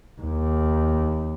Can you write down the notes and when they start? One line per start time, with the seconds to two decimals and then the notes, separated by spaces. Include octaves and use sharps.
0.21 D#2